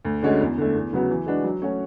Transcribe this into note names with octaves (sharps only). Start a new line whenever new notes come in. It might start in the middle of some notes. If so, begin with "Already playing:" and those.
D2
D3 G#3 C#4 F#4
E2
D3 A3
E2
C#3 F#3 B3 F#4
E3
G#3 D4 F#4 B4
F#3
A3 C#4 F#4 C#5